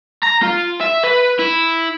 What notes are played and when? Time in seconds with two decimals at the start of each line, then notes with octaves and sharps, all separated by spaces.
0.23 A#5
0.43 F4
0.81 E5
1.04 B4
1.39 E4